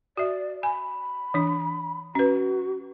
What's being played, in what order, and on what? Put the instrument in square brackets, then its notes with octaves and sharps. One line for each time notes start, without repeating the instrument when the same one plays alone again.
[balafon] F#4 E5 [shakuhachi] D5
[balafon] G#5 [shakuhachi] B5
[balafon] E3 D4
[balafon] C#4 B4 [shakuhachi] F#4